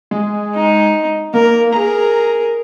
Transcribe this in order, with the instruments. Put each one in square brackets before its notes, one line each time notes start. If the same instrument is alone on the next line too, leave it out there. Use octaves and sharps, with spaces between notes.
[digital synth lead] G#3
[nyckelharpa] D#4
[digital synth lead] A#3 [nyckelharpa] A#4
[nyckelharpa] G#4 A#4 [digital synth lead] A#5